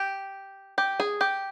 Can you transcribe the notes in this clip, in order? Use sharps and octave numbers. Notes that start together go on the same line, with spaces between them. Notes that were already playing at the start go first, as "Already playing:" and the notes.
Already playing: G4
G4
G#4
G4